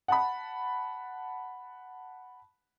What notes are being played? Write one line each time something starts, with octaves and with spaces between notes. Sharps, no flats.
F#5 A5 B5